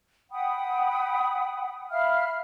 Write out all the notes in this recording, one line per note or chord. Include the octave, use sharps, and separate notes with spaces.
F#5 G5 B5 D#6
E5 F5 B5 F6